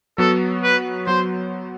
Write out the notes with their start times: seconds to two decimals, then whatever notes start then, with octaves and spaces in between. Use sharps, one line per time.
0.18 F#3 B3 F#4 A4
0.63 B4
1.06 F#3 B3 F#4 C5